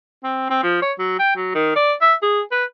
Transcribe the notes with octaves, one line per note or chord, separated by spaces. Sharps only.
C4
C4
F3
C#5
F#3
G5
F#3
D#3
D5
E5
G#4
B4